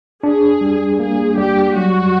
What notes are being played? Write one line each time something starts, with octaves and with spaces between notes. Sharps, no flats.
D4 G#4
G3
A#3 G#4
G3 G4
F#3 F#4